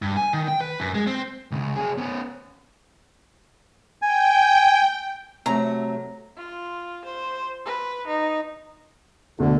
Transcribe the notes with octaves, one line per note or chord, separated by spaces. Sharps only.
G2
G#5
D#3
G5
B4
F#2
G#3
C4
C#2 C#3
F#3 G#4
B3 C#4
G5 G#5
C3 F#3 A3 A#5
F4
C5
B4
D#4
D2 B2 D3